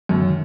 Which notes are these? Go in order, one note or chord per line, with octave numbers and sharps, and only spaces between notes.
F#2 D#3
D3
D#3